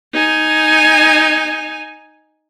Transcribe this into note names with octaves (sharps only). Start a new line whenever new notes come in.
D#4 G#5